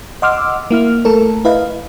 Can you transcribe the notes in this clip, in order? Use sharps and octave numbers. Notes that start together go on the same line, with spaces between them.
D#5 F#5 C6 D6 E6 F6
A#3 E4 F6
A3 A4 A#4
E4 B4 D#5 F5